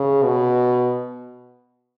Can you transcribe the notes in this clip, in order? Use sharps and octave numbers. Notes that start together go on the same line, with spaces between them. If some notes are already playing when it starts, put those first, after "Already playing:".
Already playing: C#3
B2